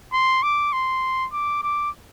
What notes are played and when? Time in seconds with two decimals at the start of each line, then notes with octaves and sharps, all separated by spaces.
0.13 C6
0.43 D6
0.73 C6
1.33 D6
1.63 D6